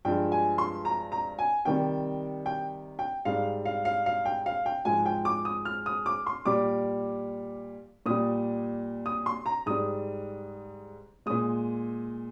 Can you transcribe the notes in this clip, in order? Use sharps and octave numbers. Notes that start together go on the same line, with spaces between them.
G2 F3 G#3 G5
G#5
C6
A#5
A#5
G#5
C3 D#3 G3 G5
G5
G5
G#2 G3 F5
F5
F5
F5
G5
F5
G5
G#2 F3 G#3 G#5
G5
D6
D#6
F6
D#6
D6
C6
A#2 G3 D6
A#2 G3 D#6
D#6
C6
A#5
G#2 G3 D#6
A#2 G#3 D#6